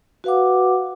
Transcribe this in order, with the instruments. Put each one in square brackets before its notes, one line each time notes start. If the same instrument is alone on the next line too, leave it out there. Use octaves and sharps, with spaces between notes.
[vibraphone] F#4 B4 F5 F#5 D6